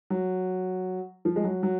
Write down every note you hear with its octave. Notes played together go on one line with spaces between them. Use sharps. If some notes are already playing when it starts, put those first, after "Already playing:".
F#3
F3
G#3
F#3
F#3